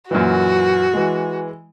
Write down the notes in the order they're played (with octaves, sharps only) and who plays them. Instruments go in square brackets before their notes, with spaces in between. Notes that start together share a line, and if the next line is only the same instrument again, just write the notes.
[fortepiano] F#2 A#2 E3 [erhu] F#4
[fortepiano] E3 G#3